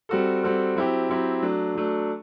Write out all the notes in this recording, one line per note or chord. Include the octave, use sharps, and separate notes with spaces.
G3 C4 F#4 A4
G3 C4 F#4 A4
F#3 C4 E4 G4
F#3 C4 E4 G4
F#3 A3 D4
F#3 A3 D4